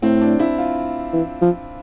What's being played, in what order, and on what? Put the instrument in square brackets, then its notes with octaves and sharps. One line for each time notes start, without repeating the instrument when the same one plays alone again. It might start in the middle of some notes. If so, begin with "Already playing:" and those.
[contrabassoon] A2 [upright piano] C4
[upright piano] D4
E4
F4
[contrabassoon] E3
F3